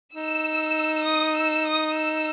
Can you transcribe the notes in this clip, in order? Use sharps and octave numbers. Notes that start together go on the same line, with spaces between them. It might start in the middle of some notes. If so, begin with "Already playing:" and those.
D#4 E6
D#6
E6
D#6
E6